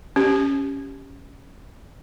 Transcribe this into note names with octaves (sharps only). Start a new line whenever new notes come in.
C#4 G4